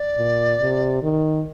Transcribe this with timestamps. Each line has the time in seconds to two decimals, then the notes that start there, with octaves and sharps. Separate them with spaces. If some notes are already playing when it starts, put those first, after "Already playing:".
Already playing: D5
0.18 A#2
0.60 C3
1.03 D#3